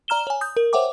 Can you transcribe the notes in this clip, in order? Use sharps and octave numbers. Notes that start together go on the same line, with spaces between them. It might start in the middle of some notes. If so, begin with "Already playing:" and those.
D5 A#5 F6 E7 G7
C#5 G#5
D#6 G6
A#4
C5 C#5 E5 F#5 G5 D6